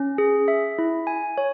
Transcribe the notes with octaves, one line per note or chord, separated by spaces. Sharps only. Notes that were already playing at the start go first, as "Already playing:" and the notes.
Already playing: C#4
G#4
E5
E4
G#5
C#5